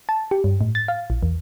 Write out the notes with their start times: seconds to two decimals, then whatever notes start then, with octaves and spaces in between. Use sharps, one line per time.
0.09 A5
0.31 G4
0.44 G2
0.61 A2
0.75 A6
0.88 F5
1.10 A#1
1.23 E2